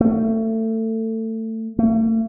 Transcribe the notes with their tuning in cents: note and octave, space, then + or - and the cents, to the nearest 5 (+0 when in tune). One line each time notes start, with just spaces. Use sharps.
A3 +25
A3 +40